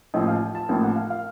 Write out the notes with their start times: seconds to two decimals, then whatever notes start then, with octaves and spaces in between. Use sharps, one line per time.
0.14 A1 A2 F3 A#3 D#5
0.28 F5
0.55 A5
0.69 A1 A2 F3 A#3
0.83 F#5
0.96 F5
1.10 F5